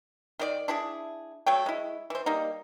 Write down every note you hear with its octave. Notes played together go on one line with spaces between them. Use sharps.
D#3 F4 D5
D4 E4 G#4
F#3 A3 C#5 G5
G#3 E4
E3 C5
G3 A#3 D#4